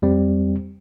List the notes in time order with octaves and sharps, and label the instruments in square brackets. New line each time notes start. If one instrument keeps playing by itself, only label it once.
[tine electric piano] F2 G3 C4